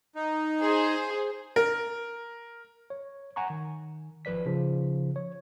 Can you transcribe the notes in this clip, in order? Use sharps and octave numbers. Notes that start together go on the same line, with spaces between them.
D#4
G#4 C5
A#4
C#5
F#5 G#5 A#5 C#6
D#3
G#1 F3 B4 D5 B6
C#3 F3
C#5